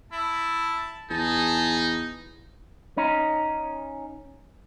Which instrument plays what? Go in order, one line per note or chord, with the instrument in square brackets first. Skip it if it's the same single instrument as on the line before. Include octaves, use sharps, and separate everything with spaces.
[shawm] E4 [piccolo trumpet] A5
[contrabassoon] E2 [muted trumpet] D#4 [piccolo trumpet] G#4 [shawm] A5
[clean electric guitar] C#4 D#4